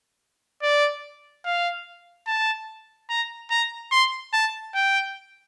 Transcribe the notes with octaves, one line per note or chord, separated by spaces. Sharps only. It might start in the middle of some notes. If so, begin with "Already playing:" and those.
D5
F5
A5
A#5
A#5
C6
A5
G5